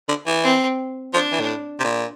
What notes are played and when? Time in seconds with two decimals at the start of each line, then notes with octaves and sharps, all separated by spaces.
0.08 D3
0.26 E3
0.44 C4
1.14 F3 D4
1.32 E3
1.40 A2
1.80 C3
1.84 A#2